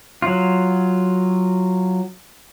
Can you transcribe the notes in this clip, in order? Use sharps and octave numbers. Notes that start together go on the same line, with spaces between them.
F#3 F4